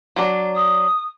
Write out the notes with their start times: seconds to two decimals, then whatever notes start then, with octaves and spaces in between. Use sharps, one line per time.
0.16 F#3 D4
0.55 D#6